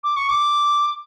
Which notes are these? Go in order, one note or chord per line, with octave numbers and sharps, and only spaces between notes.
D6
C#6
D6